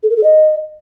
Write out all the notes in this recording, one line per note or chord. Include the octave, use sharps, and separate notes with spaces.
A4
A#4
A4
D#5